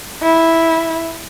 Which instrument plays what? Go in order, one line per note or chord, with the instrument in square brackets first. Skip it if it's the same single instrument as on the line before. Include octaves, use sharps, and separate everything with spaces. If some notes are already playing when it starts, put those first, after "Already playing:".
[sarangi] E4